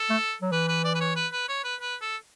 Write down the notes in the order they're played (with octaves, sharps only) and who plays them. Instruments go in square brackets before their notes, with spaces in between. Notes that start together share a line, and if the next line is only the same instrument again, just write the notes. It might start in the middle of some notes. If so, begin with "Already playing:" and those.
Already playing: [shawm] A4
[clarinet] A3
F#3
[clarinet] E3 [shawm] B4
[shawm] B4
D5
B4
C#5
B4
B4
C#5
B4
B4
A4